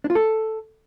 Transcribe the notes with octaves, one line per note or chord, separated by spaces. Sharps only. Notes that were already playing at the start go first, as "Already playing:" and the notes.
D4
F4
A4